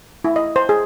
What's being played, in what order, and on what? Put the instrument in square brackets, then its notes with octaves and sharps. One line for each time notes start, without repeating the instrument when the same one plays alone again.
[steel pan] E4
D#5
C5
G#4